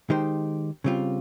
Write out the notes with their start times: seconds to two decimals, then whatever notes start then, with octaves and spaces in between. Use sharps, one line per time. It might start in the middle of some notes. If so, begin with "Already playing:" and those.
0.10 D#3 G#3 D#4 G4 C5
0.84 C#3 G3 C4 F4